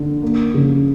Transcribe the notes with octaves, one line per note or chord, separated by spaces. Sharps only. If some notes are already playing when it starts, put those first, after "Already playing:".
Already playing: D3
A#3
C#3